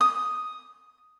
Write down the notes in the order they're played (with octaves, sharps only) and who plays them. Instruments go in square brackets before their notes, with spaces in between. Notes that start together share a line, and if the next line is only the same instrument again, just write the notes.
[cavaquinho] D#6